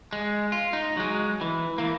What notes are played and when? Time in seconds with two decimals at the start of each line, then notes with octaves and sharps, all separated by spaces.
0.13 G#3
0.52 F4
0.73 D#4
0.97 F#3 G#3
1.41 E3
1.78 E3 A#3